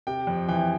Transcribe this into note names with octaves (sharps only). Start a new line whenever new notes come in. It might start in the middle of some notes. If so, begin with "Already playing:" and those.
C3 G5
F2
E3 G5